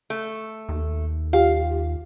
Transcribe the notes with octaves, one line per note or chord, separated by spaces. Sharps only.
A3
D#2
F4 G4 F5